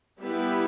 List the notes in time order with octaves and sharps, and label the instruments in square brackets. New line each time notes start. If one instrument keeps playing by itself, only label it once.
[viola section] G3 B3 E4 G4 B4